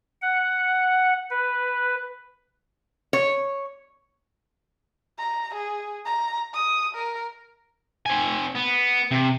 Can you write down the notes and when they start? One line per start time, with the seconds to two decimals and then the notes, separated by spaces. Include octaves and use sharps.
0.22 F#5
1.31 B4
3.13 C#5
5.18 A#5
5.54 G#4
6.06 A#5
6.54 D#6
6.95 A#4
8.06 C4 G#5
8.55 B3
9.11 C3